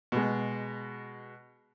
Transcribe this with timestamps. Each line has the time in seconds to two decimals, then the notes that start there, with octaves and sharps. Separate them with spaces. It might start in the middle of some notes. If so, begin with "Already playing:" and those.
0.12 B2 G#3